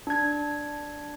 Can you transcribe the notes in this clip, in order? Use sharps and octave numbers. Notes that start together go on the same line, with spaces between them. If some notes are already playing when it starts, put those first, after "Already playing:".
D4 G#6